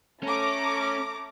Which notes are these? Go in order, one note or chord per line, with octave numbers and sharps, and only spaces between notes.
A3 C#4 A#5 D6